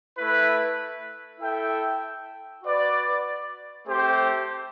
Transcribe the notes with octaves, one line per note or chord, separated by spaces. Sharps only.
A3 E4 B4
E4 A4 E5 G5
F#4 B4 D5
A3 C4 G4 C5